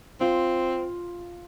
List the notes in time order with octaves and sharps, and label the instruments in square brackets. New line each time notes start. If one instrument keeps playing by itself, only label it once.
[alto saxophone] C4 [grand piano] F4